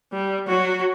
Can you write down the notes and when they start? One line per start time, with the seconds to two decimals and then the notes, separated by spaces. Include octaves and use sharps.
0.13 G3
0.48 F#3 F#4